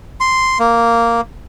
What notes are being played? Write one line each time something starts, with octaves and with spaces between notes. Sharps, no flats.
C6
A#3